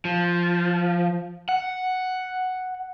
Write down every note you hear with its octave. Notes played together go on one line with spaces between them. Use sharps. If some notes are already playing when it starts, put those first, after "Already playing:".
F3
F#5